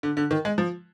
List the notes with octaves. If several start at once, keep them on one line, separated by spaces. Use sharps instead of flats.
D3
D3
D#3
G#3
F3